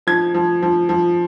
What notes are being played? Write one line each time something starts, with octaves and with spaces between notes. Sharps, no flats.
F3 G#6
F3
F3
F3